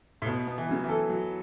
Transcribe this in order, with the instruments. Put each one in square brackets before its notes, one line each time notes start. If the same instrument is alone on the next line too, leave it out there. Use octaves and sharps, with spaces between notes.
[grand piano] A2
[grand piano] B2 [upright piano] B3
[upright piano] B3
[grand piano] E3
[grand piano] C#3 [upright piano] F#3
[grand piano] E3
[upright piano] A4
F#3